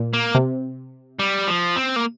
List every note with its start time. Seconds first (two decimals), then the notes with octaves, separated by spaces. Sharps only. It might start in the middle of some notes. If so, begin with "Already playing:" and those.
Already playing: A#2
0.14 A#3
0.35 C3
1.19 G3
1.47 F3
1.76 C4
1.96 A#3